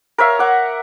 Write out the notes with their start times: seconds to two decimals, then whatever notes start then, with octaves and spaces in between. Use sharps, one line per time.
0.18 A#4 C#5 E5 F5
0.39 F#5 D6